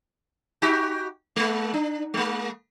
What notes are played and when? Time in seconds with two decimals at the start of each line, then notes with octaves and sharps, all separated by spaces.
0.62 D#4 F#4 G4
1.36 G#3 A#3
1.74 D4
2.14 G#3 A#3